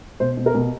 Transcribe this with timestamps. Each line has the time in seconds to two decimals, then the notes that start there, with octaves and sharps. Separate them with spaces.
0.20 B2 C5
0.37 B2
0.46 A#4
0.55 B2